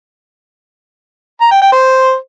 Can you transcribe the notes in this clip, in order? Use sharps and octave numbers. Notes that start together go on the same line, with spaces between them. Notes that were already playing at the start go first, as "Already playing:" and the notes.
A#5
G5
G5
C5